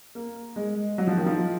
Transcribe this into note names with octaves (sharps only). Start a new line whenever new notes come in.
A#3
G#3
F#3
F3
D#3
F3